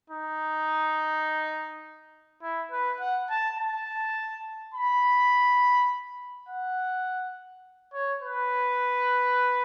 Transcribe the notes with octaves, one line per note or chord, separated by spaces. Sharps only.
D#4
E4
B4
F#5
A5
A5
B5
F#5
C#5
B4